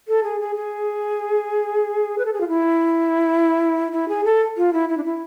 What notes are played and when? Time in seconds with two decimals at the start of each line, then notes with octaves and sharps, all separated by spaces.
0.08 A4
0.24 G#4
0.40 G#4
0.56 G#4
2.18 B4
2.26 A4
2.33 G#4
2.41 F4
2.48 E4
3.92 E4
4.08 G#4
4.25 A4
4.57 F4
4.73 E4
4.89 E4
4.97 D4
5.04 E4